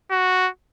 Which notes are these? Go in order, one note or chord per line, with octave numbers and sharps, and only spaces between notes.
F#4